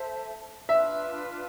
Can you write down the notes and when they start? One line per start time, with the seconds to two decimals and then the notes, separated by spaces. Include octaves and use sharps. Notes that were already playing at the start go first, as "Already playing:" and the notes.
Already playing: A4 C5 E5 A5
0.68 D4 F4 B4 E5